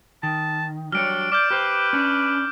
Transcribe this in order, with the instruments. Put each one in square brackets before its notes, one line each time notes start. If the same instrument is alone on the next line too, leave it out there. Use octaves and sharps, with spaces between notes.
[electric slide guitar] D#3 [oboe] A5
[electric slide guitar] F#3 G3 C#5 [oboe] D4 [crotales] F6 D7
[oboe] D5 [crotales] D6 F6 G6
[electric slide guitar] G4 C5 [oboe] B4
[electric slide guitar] C#4 D4